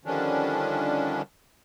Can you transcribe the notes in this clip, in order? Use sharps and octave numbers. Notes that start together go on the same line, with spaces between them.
D3 D#3 F3 G3 C#4 D4